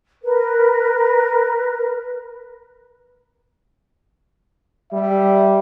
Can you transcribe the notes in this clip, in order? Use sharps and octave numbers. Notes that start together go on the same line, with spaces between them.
A#4 B4
G3 E5